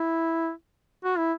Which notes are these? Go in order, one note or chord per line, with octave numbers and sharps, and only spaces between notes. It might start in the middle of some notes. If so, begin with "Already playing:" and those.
Already playing: E4
F#4
E4